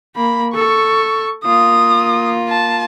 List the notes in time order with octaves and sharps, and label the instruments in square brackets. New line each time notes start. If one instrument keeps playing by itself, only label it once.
[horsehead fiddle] A#3 [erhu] B5
[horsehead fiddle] A4 [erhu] C#6
[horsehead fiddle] A#3 F4 [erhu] D#6
[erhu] A5